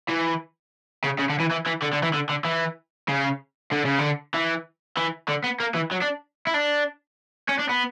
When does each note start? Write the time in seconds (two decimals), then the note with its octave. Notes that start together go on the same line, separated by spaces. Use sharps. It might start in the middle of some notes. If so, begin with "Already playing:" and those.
0.09 E3
1.04 C#3
1.19 C#3
1.30 D3
1.40 E3
1.51 E3
1.66 E3
1.82 D3
1.93 D3
2.03 E3
2.14 D3
2.29 D3
2.45 E3
3.08 C#3
3.71 D3
3.85 C#3
3.98 D3
4.34 E3
4.97 E3
5.28 D3
5.44 B3
5.60 A#3
5.75 E3
5.92 F#3
6.02 D4
6.47 E4
6.54 D4
7.49 C#4
7.59 D4
7.69 B3